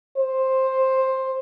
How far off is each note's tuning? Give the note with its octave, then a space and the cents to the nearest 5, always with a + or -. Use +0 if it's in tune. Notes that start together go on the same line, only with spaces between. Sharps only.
C5 +10